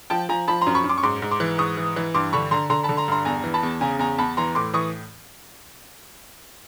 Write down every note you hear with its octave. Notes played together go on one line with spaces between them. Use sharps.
F3 G5 A5
F3 G#5 A#5
F3 A5 B5
A#5 C6
F#2
B5 C#6
F#2
C6 D6
C#6
G#2 C6 D6
G#2
C6 D6
E3
G#2 C#6 D#6
E3
E3
G2 C6 D6
D3 B5 C#6
D3 A#5 C6
D3 A#5 C6
A5 B5
D3
A#5 C6
G2 A#5 C6
E2 G#5 A#5
E3
A5 B5
E2
C#3 G#5 A#5
E2 G#5 A#5
E2 A5 B5
E3 A#5 C6
A2 C6 D6
E3 C#6 D#6